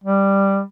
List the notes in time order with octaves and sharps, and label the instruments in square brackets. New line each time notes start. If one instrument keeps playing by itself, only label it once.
[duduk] G3